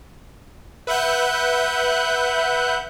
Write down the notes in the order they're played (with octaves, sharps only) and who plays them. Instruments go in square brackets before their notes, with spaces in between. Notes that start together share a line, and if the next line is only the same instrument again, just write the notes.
[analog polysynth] B4 E5 F#5 F#6 G6